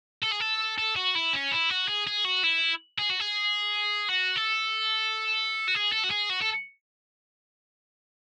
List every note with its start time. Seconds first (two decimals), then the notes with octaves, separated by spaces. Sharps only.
0.23 A4
0.32 G#4
0.41 A4
0.78 A4
0.96 F#4
1.15 E4
1.33 C#4
1.51 E4
1.70 F#4
1.88 G#4
2.07 G#4
2.25 F#4
2.44 E4
2.99 G#4
3.10 F#4
3.20 G#4
4.09 F#4
4.36 A4
5.68 F#4
5.75 G#4
5.92 A4
6.04 F#4
6.11 G#4
6.30 F#4
6.42 A4